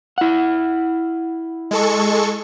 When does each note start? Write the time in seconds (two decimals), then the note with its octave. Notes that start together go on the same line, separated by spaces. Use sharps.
0.18 E4 F#5
1.71 G#3 A4 C#6